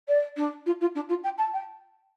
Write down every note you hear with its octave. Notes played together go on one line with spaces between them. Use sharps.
D5
D4
F4
F4
D4
F4
G5
A5
G5